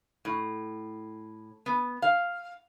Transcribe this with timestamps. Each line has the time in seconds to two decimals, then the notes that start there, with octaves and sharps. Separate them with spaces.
0.25 A2
1.66 B3
2.02 F5